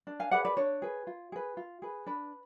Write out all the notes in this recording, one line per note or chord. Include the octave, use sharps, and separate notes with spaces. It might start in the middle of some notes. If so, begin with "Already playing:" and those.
D4
F5 G#5
G#4 B4 D5 F#5
B4 D5
D4 C#5
G#4 B4
F4
G#4 B4
F4
G#4 B4
D4 B4